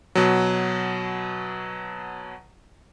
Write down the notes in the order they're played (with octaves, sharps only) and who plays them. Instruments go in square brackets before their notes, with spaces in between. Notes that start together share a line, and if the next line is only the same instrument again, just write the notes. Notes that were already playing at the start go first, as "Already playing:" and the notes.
[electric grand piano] B2 F#3